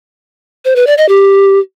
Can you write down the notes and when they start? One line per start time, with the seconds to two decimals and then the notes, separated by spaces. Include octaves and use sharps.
0.65 C5
0.76 B4
0.87 D5
0.98 D#5
1.09 G4